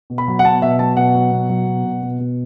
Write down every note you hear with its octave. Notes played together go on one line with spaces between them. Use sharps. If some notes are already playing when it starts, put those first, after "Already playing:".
B2
B5
F#3
F#5
B2 A5
B2 E5
F#3 A5
B2 F#5
F#3
B2
F#3
B2
B2
B2
B2